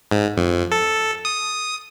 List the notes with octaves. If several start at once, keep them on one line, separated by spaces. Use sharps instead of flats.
G#2
F2
A4
D#6